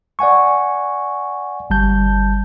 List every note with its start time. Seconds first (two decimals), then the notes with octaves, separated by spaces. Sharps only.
0.19 D5 F#5 G#5 C#6
1.70 G1 G3 A5 G6